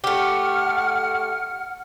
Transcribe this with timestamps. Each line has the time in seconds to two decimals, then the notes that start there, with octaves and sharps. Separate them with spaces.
0.04 A3 G4 F#5 F6